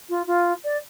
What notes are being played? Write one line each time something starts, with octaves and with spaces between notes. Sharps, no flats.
F4
F4
D5